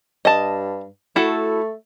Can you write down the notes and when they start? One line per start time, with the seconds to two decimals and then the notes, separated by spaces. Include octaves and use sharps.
0.25 G2 D#5 A5
1.16 A3 E4 F#4 A4